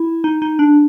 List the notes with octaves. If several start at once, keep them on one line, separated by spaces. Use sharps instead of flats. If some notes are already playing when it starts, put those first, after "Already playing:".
Already playing: E4
D#4
D#4
D4